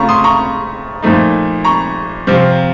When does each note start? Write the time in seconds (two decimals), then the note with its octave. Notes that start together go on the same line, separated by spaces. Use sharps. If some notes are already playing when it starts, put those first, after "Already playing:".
Already playing: C#3 A3 C#4 F4 A#5 C#6
0.09 C6 D#6
0.24 A#5 C#6
1.02 A#2 F3 A3 D#4
1.65 A#5 C#6
2.27 C3 F3 C4 F4